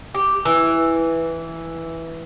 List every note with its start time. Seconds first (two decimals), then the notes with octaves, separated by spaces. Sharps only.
0.15 G4
0.45 E3